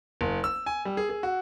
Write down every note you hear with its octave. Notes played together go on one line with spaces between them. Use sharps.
F#1
E6
G#5
G3
G#4
G#4
F#4